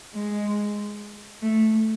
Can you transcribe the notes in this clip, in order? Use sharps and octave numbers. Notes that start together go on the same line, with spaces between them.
G#3
A3